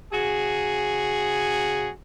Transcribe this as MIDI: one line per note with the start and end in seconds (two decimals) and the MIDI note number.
0.13 1.90 49
0.13 1.90 66
0.13 1.90 68